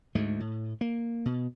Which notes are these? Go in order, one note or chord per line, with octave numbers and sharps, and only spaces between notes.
D2 G#2 G#3 A3
A2
A#3
B2